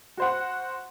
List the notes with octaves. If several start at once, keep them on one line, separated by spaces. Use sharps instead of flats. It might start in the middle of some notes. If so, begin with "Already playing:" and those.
F#4 C5 F#5